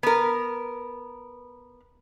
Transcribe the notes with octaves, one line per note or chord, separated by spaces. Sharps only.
B3 A#4